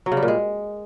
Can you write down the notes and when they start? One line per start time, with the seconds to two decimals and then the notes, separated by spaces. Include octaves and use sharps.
0.06 F#3
0.12 C#3
0.17 G3
0.23 A#2
0.28 G#3